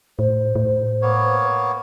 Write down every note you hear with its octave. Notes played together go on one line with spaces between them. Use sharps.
A2 C5
A2
A#3 B3 C#5